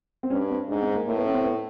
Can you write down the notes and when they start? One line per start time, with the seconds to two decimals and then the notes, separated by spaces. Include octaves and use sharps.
0.23 C4
0.30 G2 C#4
0.50 C4
0.69 G#2 D4
0.81 C4
0.94 A#3
1.06 A2 A#3
1.17 B3
1.25 C#4
1.34 C4
1.44 B3